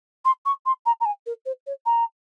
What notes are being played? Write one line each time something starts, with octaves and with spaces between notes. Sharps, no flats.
C6
C#6
C6
A#5
A#5
G#5
A#4
C5
C#5
A#5